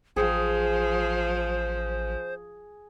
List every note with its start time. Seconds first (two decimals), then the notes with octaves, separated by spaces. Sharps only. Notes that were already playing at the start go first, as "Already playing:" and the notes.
0.16 A1 F3 G#4 C5